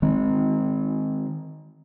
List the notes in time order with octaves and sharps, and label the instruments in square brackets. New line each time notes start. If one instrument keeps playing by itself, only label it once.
[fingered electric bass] D#3 G#3 C4